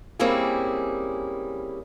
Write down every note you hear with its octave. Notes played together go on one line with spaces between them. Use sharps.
G3 A#3 C4 C#4 E4 G#4